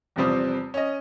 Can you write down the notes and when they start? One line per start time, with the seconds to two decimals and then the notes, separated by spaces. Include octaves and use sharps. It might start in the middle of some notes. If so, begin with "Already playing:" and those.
0.16 E2 C3 F3 G3 C4 D#6
0.74 C#4 D#5